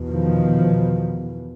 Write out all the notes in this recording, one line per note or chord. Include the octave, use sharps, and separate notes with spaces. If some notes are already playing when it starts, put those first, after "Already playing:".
Already playing: E2 B2
D#3 F3